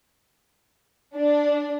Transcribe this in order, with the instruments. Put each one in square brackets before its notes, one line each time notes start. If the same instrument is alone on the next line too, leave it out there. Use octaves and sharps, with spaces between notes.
[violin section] D4